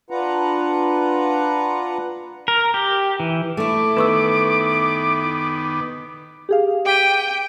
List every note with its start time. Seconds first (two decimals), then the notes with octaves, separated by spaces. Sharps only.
0.10 D4 F4 B4 F#5 A#5
2.48 A#4
2.74 G4
3.20 E3
3.57 A3 E4 D6
3.97 D#3 B3 B4 C#6 E6
6.49 G4 G#4 F5
6.86 G5 D6 B6 D#7